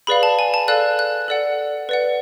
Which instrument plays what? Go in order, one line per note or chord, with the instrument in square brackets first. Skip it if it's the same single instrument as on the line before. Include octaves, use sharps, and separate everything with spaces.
[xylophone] G#4 B4 D5 F5 B5
A5
G#5
A5
A4 D5 F5 F#6
F#6
A4 D5 F#5
B4 D5 F#5